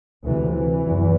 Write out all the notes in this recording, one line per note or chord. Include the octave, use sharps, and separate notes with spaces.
D2 C3 E3
E3
F#1 E2